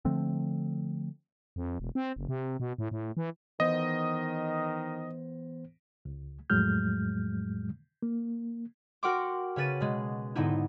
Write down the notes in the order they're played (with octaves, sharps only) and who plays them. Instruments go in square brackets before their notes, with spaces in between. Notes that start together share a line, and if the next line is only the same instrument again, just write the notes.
[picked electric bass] D3 F3 A3 C4
[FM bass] F2
E1
C4
F#1
C3
B2
A2
A2
E3
[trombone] D#3 [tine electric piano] E3 B3 C5 [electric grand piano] D#5
[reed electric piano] C#2
F2 A2 F#3 G#3 F6 G6
A#3
[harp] F#4 A#4 F#5 G5 C6 D6
C#3 C#4 B4 A6 D#7
B2 G#3
G#2 D3 B3 C4 D#4 E4